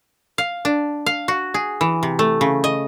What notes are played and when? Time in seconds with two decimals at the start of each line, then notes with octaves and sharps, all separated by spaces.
0.38 F5
0.65 D4
1.06 F5
1.28 F#4
1.54 G#4
1.81 E3
2.03 C3
2.19 A3
2.41 C#3
2.64 D#5